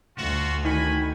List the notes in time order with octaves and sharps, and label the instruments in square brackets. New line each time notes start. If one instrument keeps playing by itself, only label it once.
[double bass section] D2 [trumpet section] F4 F#4
[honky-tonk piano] D#3 [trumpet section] G#5 B5